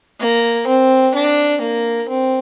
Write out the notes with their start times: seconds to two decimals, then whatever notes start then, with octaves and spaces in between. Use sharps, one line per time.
0.20 A#3
0.67 C4
1.15 D4
1.61 A#3
2.08 C4